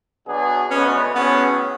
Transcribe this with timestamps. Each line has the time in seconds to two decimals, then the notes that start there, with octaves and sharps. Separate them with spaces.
0.27 B2 F#3 B3 D4 G#4
0.70 D2 C#3 G#3 B3 C#4
1.15 A2 F#3 B3 C#4 G#4